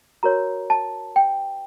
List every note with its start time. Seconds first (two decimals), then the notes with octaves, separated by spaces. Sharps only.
0.23 F#4 A#4 C#5 A#5
0.70 A5
1.16 G5